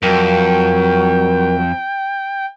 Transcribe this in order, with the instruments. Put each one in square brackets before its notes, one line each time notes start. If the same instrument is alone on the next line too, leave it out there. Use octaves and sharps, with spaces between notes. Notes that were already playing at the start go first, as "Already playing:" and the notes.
[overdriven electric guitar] F2 [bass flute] F#3 [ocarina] A#4 [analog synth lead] G5